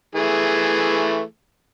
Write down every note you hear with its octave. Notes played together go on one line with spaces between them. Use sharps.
E3 A3 G#4